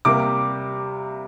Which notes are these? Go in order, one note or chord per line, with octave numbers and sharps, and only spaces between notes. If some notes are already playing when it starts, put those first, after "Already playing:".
C3 G3 A#3 D6